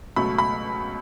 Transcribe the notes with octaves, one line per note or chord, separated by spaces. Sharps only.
C#2 B2 F#3 A3 B5
B5